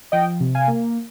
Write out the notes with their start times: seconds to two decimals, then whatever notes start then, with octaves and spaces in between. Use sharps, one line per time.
0.12 F3 D#5 G5
0.40 C3
0.55 F5 G#5
0.68 A#3